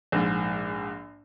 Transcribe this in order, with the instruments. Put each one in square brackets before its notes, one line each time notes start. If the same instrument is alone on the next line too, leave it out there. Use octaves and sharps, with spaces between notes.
[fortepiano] A#1 G#2